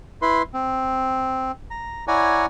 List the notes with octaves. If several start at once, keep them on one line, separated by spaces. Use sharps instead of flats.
E4 B4 C6
C4
A#5
E4 C#5 D5 F#5 G#5 A#5